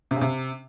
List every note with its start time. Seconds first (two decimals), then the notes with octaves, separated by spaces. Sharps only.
0.11 C3
0.16 C#3
0.21 C3